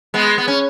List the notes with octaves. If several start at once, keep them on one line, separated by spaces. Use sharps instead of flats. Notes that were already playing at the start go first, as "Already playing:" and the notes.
G#3 B3
B3
C#4